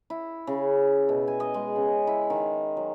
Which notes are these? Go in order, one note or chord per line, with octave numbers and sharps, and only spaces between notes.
E4
C#3
B2
G#5
D#5
G#3
C#3
E4
D#3
F#3